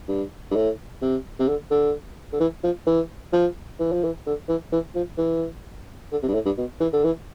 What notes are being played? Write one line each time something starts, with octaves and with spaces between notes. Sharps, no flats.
G2
G2
A2
C3
C3
D3
D3
D3
E3
F3
E3
F3
E3
F3
E3
D3
E3
E3
F3
E3
D3
C3
G2
A2
G2
B2
E3
D3
E3